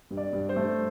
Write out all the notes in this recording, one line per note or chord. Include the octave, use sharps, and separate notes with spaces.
G2
D5
G2
C5
A3